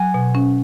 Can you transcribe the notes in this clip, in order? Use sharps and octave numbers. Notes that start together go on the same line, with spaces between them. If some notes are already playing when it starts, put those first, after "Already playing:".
Already playing: F#3 F#5 G#5
B2
C#4